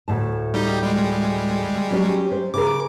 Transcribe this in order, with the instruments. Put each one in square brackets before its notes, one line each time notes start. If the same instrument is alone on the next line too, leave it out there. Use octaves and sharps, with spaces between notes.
[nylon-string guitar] D2 A2 A5
[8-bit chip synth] G3 D#4 G4
G3 G#3
[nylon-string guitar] F#3 C#4 G4
C5
[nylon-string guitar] C#3 A#4 [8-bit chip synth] D6